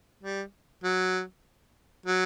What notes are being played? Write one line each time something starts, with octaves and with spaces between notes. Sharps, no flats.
G3
F#3
F#3